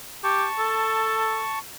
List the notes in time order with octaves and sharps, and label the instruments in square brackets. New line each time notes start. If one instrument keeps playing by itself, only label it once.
[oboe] G4 [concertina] A5 C#6
[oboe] A4